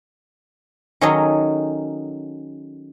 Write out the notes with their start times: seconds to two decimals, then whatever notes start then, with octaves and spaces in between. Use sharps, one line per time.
1.01 D#3 F#3 C#4 G#4 A4 D#5